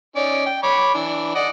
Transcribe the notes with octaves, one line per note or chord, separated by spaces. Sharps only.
C#4 D#4 D5
G5
C#5 B5 D6
E3 D4
D5 D#5 F#5